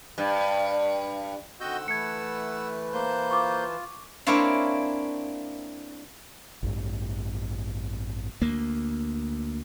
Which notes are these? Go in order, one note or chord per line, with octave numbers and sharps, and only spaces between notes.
G2
D3 D#3 C4 F#4 D#5 F#5 E6 G6
E3 A3 B4 A5 G#6 C#7
A#3 C5 G6
F4 C#6 D6
A#3 C4 D4 E4 C#5 F5
A1 G2
D2 A#3